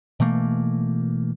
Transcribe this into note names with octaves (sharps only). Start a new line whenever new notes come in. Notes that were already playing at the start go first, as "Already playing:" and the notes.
B2 E3 A3 A#3